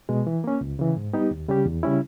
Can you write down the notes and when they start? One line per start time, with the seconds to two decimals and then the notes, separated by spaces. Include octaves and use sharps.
0.09 B2 G#3
0.27 E3
0.44 A#3 C#4
0.61 C#2
0.79 C#3 E3
0.96 G#2
1.13 G3 B3 D#4 G4
1.31 D#2
1.48 C#3 G3 C#4 G4
1.66 E2
1.83 C#3 G3 C#4 E4